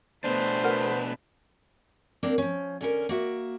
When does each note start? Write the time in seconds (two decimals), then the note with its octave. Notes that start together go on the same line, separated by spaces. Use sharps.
0.24 B2 A3 B3 D4 B4 C5
0.63 F#4 A#4 F#5
2.23 A#3 C4 D4 A#4
2.38 F3 C#4
2.81 D3 C#4 A#4
3.09 A#3 F#4 E5